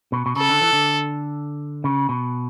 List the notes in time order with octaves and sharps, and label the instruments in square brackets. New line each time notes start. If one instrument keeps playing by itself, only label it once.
[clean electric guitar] B2
B2
[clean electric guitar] C#3 [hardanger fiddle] A4
[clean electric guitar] D3
E3
D3
C#3
B2